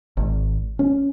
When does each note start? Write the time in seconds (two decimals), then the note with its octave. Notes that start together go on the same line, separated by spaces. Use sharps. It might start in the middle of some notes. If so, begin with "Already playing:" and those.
0.17 G#1
0.79 C#4